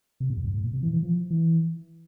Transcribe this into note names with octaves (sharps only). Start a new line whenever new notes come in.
C3
A#2
F2
G2
A2
A#2
C3
E3
E3
F3
E3